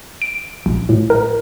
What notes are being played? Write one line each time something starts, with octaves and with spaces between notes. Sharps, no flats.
D7
A#1
A2
A#4